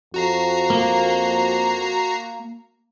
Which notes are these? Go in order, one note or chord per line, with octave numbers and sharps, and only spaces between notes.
F2 F#4 A#5 C7
A#3